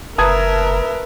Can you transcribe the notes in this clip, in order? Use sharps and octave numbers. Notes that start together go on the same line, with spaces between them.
F#1 A#4 B4 E5 A5 A#5 D#6 G#6